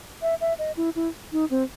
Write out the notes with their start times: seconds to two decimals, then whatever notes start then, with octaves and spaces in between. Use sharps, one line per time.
0.22 E5
0.41 E5
0.59 D#5
0.77 E4
0.96 E4
1.32 D#4
1.50 C4